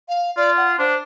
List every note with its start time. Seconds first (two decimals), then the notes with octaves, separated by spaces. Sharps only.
0.08 F5
0.37 F4 D5
0.57 F#5
0.79 D4 C5